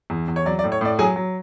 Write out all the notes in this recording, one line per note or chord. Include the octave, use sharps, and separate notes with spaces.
E2
E2
C#5
F#3 D5
D5
A2
C#5
A2 D5
F#3 G#4 G#5
F#3